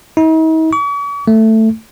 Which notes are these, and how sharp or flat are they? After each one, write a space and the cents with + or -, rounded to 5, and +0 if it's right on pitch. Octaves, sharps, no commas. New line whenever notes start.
D#4 +45
C#6 +45
A3 +10